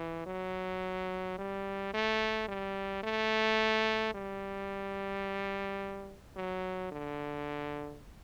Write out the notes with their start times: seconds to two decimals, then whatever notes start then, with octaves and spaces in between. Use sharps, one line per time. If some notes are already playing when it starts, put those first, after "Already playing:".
Already playing: E3
0.26 F#3
1.38 G3
1.93 A3
2.48 G3
3.03 A3
4.14 G3
6.36 F#3
6.92 D3